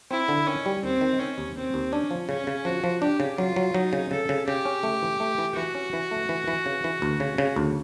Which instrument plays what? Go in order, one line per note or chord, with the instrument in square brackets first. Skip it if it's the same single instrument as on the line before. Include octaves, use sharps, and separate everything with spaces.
[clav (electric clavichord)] C4 [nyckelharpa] E4
[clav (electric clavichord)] D3
[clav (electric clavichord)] D#3 [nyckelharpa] C#4
[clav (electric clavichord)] G3
[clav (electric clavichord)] D#2 [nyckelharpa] C4
[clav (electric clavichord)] D#3
[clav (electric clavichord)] D#3 [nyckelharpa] C#4
[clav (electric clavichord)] D#2
[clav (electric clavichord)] D#2 [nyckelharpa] C4
[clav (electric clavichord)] D#2
[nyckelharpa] C#4 [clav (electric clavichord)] D4
[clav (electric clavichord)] F3
[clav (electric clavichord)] C#3 [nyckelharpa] C#4
[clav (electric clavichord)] C#3
[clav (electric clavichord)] F3 [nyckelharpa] F#4
[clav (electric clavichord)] F3
[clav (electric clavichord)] D4 [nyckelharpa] G4
[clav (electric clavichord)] C#3
[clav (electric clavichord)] F#3 [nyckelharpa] F4
[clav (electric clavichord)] F#3
[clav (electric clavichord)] F#3 [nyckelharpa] D#4
[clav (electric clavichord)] C#3
[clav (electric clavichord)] C#3 [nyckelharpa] A4
[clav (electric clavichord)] C#3
[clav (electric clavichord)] C#3 [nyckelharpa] G4
[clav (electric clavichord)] C#4
A3
E3
A3
E3
[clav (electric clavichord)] E3 [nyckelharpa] F#4
[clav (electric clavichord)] C#4
E3
A3
E3
E3
C#3
E3
D2
C#3
C#3
D2